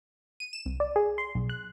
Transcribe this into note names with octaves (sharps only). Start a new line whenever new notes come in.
D#7
E7
C2
D5
G#4
C6
B1
F#6